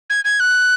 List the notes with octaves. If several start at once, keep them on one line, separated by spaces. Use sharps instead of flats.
G#6
G#6
F#6